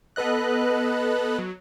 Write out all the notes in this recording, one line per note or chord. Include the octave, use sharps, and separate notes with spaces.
B3 A4 B4 D#5 F#6
F#3